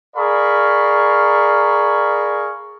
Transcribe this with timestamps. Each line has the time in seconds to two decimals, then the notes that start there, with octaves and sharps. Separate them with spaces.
0.17 G#4 A#4 D5 F5 B5 C#6